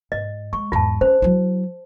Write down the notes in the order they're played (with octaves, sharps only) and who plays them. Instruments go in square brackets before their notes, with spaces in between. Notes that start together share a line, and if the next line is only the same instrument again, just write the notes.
[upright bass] G#2 [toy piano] D#5
[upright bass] G#3 [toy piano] C#6
[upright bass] E2 G#2 [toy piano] F4 A5
[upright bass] C#4 [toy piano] C5
[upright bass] F#3 E4